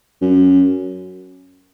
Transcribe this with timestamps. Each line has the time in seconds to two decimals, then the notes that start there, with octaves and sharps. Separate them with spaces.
0.21 F#2